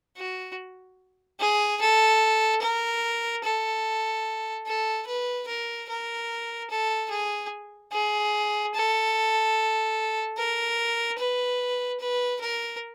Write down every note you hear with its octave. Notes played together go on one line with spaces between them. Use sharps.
F#4
G#4
A4
A#4
A4
A4
B4
A#4
A#4
A4
G#4
G#4
A4
A#4
B4
B4
A#4